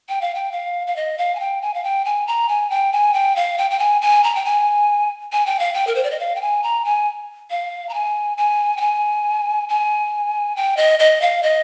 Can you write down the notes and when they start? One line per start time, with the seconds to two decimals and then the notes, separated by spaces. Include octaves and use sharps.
0.09 G5
0.21 F5
0.35 G5
0.52 F5
0.87 F5
0.96 D#5
1.18 F5
1.35 G#5
1.40 G5
1.62 G#5
1.74 F5
1.84 G5
2.05 G#5
2.27 A#5
2.49 G#5
2.70 G5
2.93 G#5
3.14 G5
3.36 F5
3.58 G5
3.71 G5
3.79 G#5
4.02 G#5
4.24 A#5
4.35 G5
4.45 G#5
5.32 G#5
5.46 G5
5.59 F5
5.74 G5
5.87 A#4
5.95 C5
6.04 D5
6.11 D#5
6.20 F5
6.36 G5
6.41 G#5
6.63 A#5
6.85 G#5
7.50 F5
7.89 A#5
7.94 G#5
8.37 G#5
8.77 G5
8.81 G#5
9.69 G#5
10.56 G5
10.77 D#5
10.99 D#5
11.21 F5
11.43 D#5